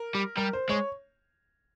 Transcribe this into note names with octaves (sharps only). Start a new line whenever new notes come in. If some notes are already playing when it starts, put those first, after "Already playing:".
Already playing: A#4
G3
G3 A#4
C5
G#3 C#5